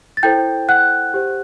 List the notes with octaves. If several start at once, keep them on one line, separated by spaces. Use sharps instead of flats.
A6
E4 A4 C5 G5 G6
F#5 F#6
G4 C5